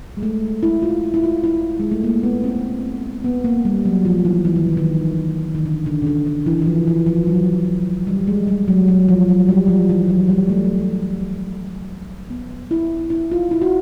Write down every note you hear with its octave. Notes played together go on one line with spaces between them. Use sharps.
G#3
A3
E4
F4
E4
F4
E4
G#3
A3
A#3
B3
C4
B3
A#3
G3
F#3
F3
E3
E3
D#3
D3
D#3
D#3
D3
D3
C#3
D3
D3
E3
E3
F3
E3
F3
F#3
G3
G#3
G3
F#3
F#3
F3
F#3
G3
F3
E3
F#3
G3
A3
B3
E4
E4
F4
E4
F#4